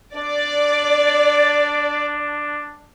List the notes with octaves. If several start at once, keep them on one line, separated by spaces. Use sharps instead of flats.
D4 D5